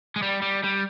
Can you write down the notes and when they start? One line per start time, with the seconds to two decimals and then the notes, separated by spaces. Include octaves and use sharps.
0.16 G#3
0.22 G3
0.42 G3
0.63 G3